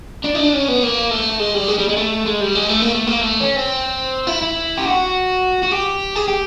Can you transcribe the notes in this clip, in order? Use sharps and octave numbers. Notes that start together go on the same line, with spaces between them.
D4
D#4
D4
C#4
B3
A#3
A3
G#3
G3
G#3
G3
G#3
A3
G#3
G3
G#3
A3
A#3
A3
A#3
A3
C#4
C4
E4
E4
G4
F#4
F#4
G4
G#4
G4